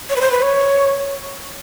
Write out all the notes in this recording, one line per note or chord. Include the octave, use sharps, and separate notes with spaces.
C#5
B4
C5
B4
C#5